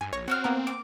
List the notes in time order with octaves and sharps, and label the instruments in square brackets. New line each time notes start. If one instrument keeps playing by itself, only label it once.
[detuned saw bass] G2 [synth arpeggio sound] G#5
[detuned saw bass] A#1 [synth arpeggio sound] C#5 A#6
[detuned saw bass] C4 [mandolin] F#4 E6 F6
[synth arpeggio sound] A#3 B3 A#4
[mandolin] D6